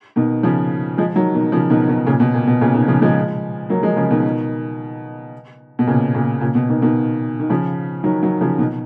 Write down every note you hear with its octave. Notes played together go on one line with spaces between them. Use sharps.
B2 D#3
C#3 F3
F3 G#3
D#3 F#3
B2 D#3
C#3 F3
B2 D#3
B2 D#3
A#2 C#3
B2
A#2
B2
A#2 C#3
B2 D#3
C#3 F3
F3 G#3
F#3 A#3
F3 G#3
C#3 F3
B2 D#3
B2
A#2 C#3
A#2 C#3
A#2 C#3
B2
B2 D#3
B2 D#3
D#3
C#3 F3
D#3 F#3
D#3 F#3
C#3 F3
B2 D#3